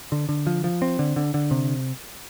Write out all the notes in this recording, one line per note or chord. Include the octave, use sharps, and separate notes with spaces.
D3
D3
F3
F3
C4
D3
D3
D3
C3